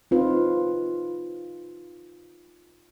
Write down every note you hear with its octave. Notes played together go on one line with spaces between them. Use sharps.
C4 D#4 F4 B4